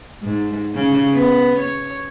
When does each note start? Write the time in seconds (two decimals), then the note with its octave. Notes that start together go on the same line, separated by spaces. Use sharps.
0.22 G#2
0.75 C#3
1.13 B3
1.59 C#5